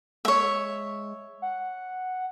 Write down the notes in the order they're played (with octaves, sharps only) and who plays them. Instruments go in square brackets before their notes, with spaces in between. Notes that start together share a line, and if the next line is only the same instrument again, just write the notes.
[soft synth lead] G#3 [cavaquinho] C#5 E5
[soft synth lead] F#5